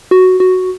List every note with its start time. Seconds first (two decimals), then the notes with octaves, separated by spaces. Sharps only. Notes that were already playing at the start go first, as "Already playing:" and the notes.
0.11 F#4
0.40 F#4